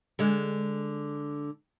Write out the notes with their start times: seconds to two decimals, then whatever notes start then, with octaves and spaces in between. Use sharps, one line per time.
0.19 D3 G#3